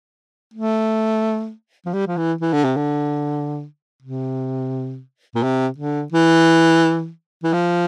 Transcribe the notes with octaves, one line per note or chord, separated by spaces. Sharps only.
A3
F3
G3
F3
E3
E3
D3
C3
D3
C3
A#2
C3
D3
E3
E3
F3